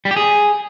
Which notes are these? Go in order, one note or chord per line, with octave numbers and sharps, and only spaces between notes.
G3
G4
G#4